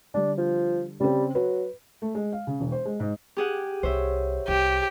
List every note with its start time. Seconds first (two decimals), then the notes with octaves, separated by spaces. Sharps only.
0.14 D3 G3 D4
0.37 F3
1.00 C#3 G3 C4
1.35 F#3 B4
2.02 A3
2.15 G#3
2.32 F5
2.47 C#3
2.60 E1
2.72 C5
2.85 G#3
3.00 G#2
3.37 G4 G#4 F#5
3.83 C2 C5 C#5 E5
4.48 C2 G4